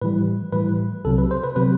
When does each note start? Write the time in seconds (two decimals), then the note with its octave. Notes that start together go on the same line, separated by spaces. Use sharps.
0.02 A2 E3 G3 B4
0.52 A2 E3 G3 B4
1.05 C2 C3 F#3 A4
1.18 B4
1.31 C5
1.44 B4
1.56 C3 F#3 B4